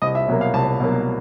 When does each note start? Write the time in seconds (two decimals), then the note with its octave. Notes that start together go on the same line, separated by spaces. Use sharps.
0.02 C2 D#5
0.15 E5
0.28 B2 F#3 A#3
0.41 F5
0.53 C2 A5
0.80 B2 F#3 A#3